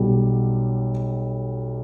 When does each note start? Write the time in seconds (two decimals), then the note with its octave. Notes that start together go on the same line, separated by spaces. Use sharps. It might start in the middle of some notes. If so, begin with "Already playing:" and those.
Already playing: B1 B2 G3